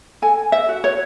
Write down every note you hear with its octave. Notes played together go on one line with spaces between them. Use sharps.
A4 G#5
E5
F#4
C#5